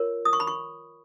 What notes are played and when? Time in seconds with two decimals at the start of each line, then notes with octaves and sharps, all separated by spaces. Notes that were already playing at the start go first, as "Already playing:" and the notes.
Already playing: F4 A#4 C#5
0.25 D#6
0.33 C#6
0.40 B5
0.47 C#6